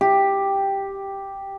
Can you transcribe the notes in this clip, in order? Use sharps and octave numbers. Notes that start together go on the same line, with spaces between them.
G4